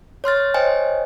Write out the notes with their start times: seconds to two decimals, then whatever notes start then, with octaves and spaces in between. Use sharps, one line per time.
0.24 C#5 C6 F6 A6
0.54 C5 C#5 D#5 G5 G#5